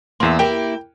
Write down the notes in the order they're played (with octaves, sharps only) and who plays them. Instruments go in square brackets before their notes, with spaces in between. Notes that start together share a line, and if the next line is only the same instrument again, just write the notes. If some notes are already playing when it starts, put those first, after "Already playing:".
[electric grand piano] E2 C6 [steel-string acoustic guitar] A#3 E5
[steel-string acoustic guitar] A#3 E4 G4 [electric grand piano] G5